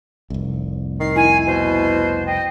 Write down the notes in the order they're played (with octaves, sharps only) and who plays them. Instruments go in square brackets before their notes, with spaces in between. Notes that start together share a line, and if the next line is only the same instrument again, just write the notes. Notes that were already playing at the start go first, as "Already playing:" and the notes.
[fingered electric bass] F1 C2
[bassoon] D#3 [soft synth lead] C7
[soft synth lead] E4 [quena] G#5
[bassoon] B2 [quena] C5
[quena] D#5 [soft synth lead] G5